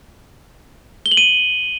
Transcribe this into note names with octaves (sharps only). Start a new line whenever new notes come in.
G7
F#7
D#7